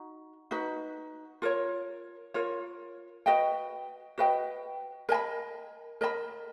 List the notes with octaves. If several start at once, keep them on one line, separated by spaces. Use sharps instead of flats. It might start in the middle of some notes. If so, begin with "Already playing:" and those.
Already playing: D#4 F#4
D#4 F#4 B4
F4 A#4 C#5
F4 A#4 C#5
F#4 B4 D#5 G5
F#4 B4 D#5 G5
A#4 D#5 G#5
B5
A#4 D#5 G#5 B5